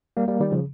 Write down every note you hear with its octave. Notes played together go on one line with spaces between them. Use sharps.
G3 A#3
G3 A#3
D#3 G3
C#3 F3